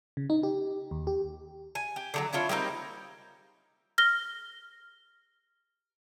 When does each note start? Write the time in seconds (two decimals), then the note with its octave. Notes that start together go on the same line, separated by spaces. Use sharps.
0.17 C#3
0.30 D#4
0.43 G4
0.91 D#2
1.07 G4
1.75 G#5
1.96 G4
2.14 D3 F3 F#3
2.33 D4 E4 F4 C#5
2.49 G3 A#3 C4 D#4
3.98 F6 A#6 G7